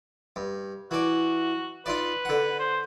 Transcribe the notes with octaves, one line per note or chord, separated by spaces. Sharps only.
G2
E3 F#4 D5
D#4 F4 B4 D5
D3 F#5
C5